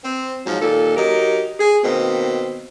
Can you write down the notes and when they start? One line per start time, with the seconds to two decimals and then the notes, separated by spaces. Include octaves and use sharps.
0.03 C4
0.46 G#2 F3 F#3
0.61 D#2 A#2 A4
0.97 F#3 D#4 G4 A#4
1.60 G#4
1.84 B2 D#3 A#3 C4